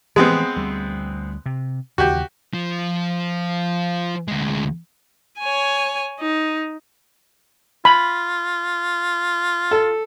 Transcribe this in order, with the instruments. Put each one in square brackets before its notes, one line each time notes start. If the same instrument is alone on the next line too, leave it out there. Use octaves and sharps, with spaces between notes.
[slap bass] E3 F3 A3 [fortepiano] G#3 B3 C4
[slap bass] D2 G3
C3
[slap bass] D#2 C#3 E3 [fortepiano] F#4 G4
[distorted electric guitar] F3
D2 G#3
[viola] C#5 G#5
D#4
[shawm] F4 [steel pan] B5
[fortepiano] A4